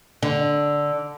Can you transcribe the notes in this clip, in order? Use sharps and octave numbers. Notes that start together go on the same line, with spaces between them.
D3